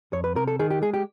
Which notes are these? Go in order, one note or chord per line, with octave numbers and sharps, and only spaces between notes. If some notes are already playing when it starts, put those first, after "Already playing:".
F2 C#5
B4
C3 A#4
A4
D#3 G#4
G4
G#3 G#4
G4